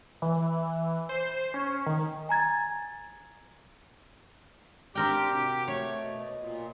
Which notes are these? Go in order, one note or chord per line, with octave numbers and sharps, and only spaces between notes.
E3
C5
C#4
D#3
G#5 A#5 G#6 A6
C4 D4 G4 A#4 G5 D6
C3 F#4
A3 C#5
B2 D#5
A#2